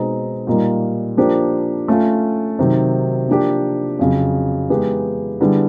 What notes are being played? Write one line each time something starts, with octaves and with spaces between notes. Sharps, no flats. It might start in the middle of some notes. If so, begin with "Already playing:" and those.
Already playing: B2 G#3 C4 D#4 G#4
A#2 G3 A#3 D#4
F3 A#3 D4 G4 C5
A3 C#4 F4
C3 D#3 F#3
F3 A#3 D4 G4
F2 C#3 F#3
E3 G#3 B3 D#4 G4
D3 G3 B3 E4 G#4